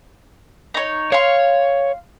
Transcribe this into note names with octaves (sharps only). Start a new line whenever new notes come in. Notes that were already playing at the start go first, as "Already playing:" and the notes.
D#4 C#5
C#5 F5 C6